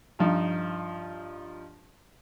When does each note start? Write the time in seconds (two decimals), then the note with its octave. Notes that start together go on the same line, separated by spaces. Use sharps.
0.19 G2 F3 D#4